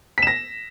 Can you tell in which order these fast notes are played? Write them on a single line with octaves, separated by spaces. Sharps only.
B6 E7 A#6